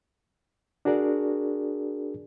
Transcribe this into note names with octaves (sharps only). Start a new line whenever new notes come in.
D4 F#4 G#4 A#4 D5